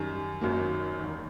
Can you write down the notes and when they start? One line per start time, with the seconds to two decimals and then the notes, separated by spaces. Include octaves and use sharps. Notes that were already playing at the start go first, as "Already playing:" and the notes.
Already playing: F#2 D#3 G3
0.41 G#1 F#2 D#3 F#3 A#3
0.99 E1 D#2 D#3